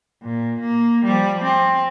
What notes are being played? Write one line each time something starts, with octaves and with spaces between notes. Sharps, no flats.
A#2
A#3
F3 G3
C4